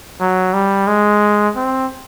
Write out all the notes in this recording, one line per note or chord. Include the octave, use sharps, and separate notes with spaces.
F#3
G3
G#3
C4